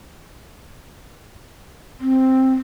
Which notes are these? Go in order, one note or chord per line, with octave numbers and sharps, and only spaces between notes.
C4